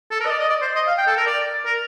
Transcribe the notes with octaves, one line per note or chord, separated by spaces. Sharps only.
A4
A#4
D#5
D5
D#5
D5
C5
D#5
F5
G5
A4
A#4
D5
A#4